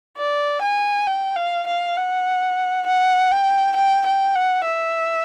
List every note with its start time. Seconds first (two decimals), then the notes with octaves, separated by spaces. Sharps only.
0.17 D5
0.62 G#5
1.07 G5
1.36 F5
1.67 F5
1.97 F#5
2.86 F#5
3.31 G5
3.76 G5
4.06 G5
4.35 F#5
4.65 E5